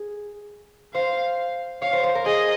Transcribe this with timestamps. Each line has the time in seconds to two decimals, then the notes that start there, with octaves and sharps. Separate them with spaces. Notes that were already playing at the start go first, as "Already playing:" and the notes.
Already playing: G#4
0.94 C5 F5
1.82 C#5 F5
1.93 C5
2.03 C5
2.15 A#4
2.26 G#4 D#5